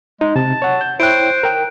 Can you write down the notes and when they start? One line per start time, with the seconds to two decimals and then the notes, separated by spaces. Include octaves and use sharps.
0.21 G#3 D#4
0.36 C3 A5
0.62 C#5 F#5
0.81 G6
1.00 E4 C5 C#5 G5 F#6 D7
1.43 A#4 G5